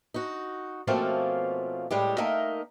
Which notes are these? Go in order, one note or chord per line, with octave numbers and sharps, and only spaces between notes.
D#4 F#4
B2 F3 A3 A#3 C4 C#4
A2 G3 G#3 G4
A3 A#3 D#4 A#4 D#5 E5